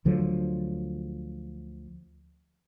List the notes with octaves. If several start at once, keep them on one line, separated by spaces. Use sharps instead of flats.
D2 D3 F3 F#3